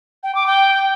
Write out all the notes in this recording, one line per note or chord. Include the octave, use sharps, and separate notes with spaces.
G5
D6
G5